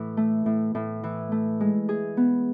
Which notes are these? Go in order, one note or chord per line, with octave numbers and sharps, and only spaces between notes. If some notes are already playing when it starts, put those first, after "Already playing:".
Already playing: A2 E3
A3
A2
A2
E3
A3
G#3
G#4
B3